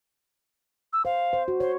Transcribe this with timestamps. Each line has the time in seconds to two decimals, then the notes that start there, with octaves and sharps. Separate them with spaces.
0.93 E6
1.05 C5 F5
1.33 C5
1.48 F#4
1.60 C5 C#5